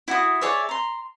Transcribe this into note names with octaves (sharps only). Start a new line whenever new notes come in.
E4 F#4 D#6
G#4 C#5 D5 E5
A#5 C6